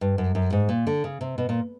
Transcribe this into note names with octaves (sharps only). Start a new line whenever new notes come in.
G2
F#2
F#2
G#2
A#2
D3
C#3
C3
B2
A#2